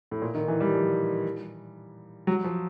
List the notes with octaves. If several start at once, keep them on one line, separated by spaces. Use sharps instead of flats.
A2
A#2
D#3
E3
G3
F3
F#3
F3